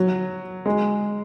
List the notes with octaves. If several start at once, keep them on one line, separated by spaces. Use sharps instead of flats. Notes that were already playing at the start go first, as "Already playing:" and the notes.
Already playing: F#3
G#3